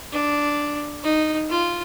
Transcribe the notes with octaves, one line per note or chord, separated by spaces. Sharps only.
D4
D#4
F4